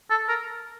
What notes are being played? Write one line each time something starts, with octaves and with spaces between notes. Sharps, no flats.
A4
A#4